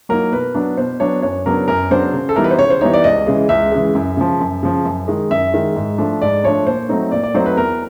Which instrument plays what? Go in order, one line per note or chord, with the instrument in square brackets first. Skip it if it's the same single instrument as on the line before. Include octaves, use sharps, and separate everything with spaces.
[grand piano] F#3 A#3 D#4 A#4
B2 B4
F#3 B3 D4
B2 C5
F#3 B3 D4 C#5
F#2 C#5
C#3 F#3 B3 D4 A#4
F#2 A#4
C#3 F#3 B3 D4 C5
C#3
A4
E3 G3 B3 D#4 A#4
B4
C5
C#3 C#5
C5
E3 G3 B3 D#4 C#5
D5
C#2 D#5
C#3 E3 G#3
C#2 E5
C#3 E3 G#3
F#2
C#3 F3
F#2
C#3 F3
F#2
D#3 G#3
F#2 E5
D#3 G#3
G#2
F3 A3 D4
G#2 D5
F3 A3 D4 C#5
A#2 C5
F#3 A3 C4 D#4
A#2 D5
D5
F#3 A3 C4 D#4 C5
B4
E2 A#4